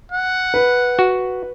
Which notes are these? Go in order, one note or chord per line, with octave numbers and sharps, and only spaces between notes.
F#5
B4
F#4